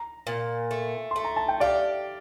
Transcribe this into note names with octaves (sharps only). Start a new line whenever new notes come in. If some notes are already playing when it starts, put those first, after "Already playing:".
Already playing: A#5
A#2
A3
A3 C6
A#5
A5
G5
G4 D5 F5